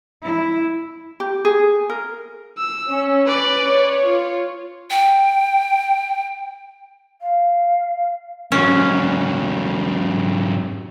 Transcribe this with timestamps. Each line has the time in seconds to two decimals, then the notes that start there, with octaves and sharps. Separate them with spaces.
0.23 E4
1.20 G4
1.45 G#4
1.90 A#4
2.58 E6
2.89 C#4
3.26 B4 D5
3.60 C#5
4.03 F4
4.91 G5
7.20 F5
8.52 G#2 F#3 C#4